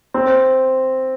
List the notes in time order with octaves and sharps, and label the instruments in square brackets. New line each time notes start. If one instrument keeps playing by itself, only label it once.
[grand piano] C4